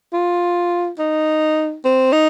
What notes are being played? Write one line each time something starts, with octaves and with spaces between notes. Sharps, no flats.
F4
D#4
C4
D#4